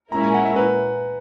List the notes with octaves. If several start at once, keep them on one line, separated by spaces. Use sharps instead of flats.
A#2 G#3 C#4 E4 A#4 A#5
G#5
F#5
E5
B4